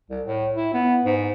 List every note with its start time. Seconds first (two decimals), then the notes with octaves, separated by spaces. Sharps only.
0.10 C2
0.26 A2
0.56 E4
0.74 B3
1.05 G#2